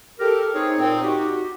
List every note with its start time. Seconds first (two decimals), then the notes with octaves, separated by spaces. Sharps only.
0.20 G4 A4 A#4
0.53 C4 D#4 G#4 C#5
0.79 A#2 C4
1.03 F#4 G4